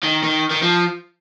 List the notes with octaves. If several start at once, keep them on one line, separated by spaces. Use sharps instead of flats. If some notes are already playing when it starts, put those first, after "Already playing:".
D#3
D#3
D#3
F3